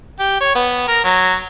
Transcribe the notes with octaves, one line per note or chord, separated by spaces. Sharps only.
G4
C#5
B3
A#4
F#3